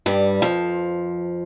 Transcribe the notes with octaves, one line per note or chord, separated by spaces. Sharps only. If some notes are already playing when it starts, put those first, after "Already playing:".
G2 G3
F2 F3